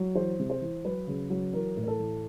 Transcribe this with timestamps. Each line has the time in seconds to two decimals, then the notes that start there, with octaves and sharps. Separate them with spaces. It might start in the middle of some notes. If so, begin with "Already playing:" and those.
Already playing: F#3
0.15 E3 C5
0.39 C3
0.50 C5
0.61 E3
0.85 F#3 B4
1.07 C#3
1.30 F#3
1.53 E3 A#4
1.76 A2
1.83 A#4
1.88 A4
1.99 E3